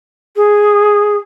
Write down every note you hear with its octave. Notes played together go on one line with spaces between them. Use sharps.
G#4